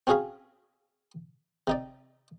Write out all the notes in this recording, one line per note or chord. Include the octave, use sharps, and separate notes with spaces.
C4 C#4 F#4 G#4 F5 B5
C3 D#4 D5